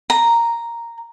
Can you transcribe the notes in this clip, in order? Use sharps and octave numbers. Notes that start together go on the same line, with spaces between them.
A#5